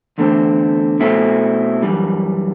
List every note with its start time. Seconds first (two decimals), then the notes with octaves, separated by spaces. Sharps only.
0.18 E2 D3 A3 C4
1.00 B2 A3 C4 E4
1.82 F#2 E3 G3